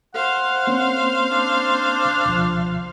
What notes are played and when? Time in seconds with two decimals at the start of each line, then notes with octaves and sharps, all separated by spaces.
0.14 C5 F5 F#5
0.67 A#3 C4 C#4
1.31 D4
2.25 C#2 B2 F3